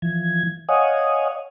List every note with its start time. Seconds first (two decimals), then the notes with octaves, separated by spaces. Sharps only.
0.02 E3 F3 G#6
0.69 C#5 D#5 F5 F#5 G#5 D#6